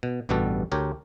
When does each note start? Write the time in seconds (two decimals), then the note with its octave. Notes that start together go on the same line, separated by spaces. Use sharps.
0.03 B2
0.29 A1 G2 B2 G3 F#4 A4
0.72 D2 G4 A#4 C#5